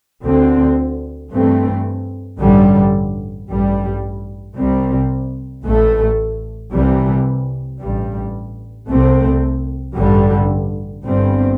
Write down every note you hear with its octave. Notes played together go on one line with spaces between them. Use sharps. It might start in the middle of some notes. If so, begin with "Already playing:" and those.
D2 D3 C4
G2 E3 A3 C4
A1 G2 D3 G3
A1 G2 G3
C2 C3 G3 C4
A1 A2 A3
C2 C3 E3 G3
A1 G2 G3
C2 C3 A3 C4
A1 G2 D3 G3
G1 G2 G3 C4